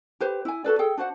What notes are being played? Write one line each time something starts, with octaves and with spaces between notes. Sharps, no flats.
G4 B4 C5
E4 G#5
F#4 A4 B4 D5
G#4 A4 G5
D4 F#4 C5 F#5